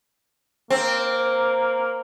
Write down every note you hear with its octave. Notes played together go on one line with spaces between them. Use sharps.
A#3 C4